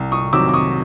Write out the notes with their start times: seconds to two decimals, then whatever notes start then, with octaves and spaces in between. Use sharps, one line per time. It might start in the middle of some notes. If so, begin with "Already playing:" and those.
Already playing: C2
0.12 C#6 D#6
0.33 C3 D#3 F#3 D6 E6
0.49 D6
0.54 C#6 D#6